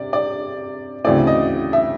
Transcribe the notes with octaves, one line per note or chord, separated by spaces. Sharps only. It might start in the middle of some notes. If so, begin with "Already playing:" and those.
Already playing: C3 D5
D5
D2 C#3 E3 A3 C4 D5
D#5
E5